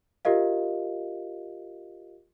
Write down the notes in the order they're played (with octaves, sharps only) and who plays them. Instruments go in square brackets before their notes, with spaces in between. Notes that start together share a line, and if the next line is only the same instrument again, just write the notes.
[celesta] F4 G4 A#4 D#5 F5